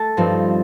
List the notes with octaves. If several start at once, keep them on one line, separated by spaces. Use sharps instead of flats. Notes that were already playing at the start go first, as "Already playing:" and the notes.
Already playing: A3 A4 A5
G2 F3 C4 D#4